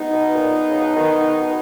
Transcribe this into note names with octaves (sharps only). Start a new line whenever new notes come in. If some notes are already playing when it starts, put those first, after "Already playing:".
Already playing: G#3 B3 D#4
B2
A#2
C#3
B2
D#3
D#3
D#3
B2